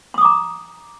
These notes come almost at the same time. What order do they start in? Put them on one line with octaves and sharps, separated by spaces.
C6 D#6 D6 A#5